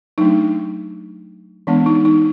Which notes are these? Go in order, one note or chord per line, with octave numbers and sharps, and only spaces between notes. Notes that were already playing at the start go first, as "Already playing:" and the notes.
F#3 A3 D4 D#4
E3 G#3 B3 D4
D#4
D#4